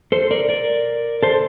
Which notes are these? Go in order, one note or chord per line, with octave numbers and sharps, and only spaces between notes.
A4 C5
A#4 D5
A#4 D5
A4 C5